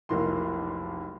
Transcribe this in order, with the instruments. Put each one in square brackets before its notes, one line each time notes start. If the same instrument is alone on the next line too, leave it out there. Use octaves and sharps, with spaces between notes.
[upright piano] F1 B1 A#3 E4 C6